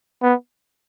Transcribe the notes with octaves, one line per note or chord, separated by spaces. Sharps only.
B3